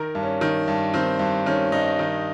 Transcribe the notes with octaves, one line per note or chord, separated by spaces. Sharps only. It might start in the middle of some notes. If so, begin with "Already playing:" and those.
Already playing: D#3 A#4
G2
C#4
D#3
G2
D#3 C4
G2
D#3 C#4
G2 D#4
D#3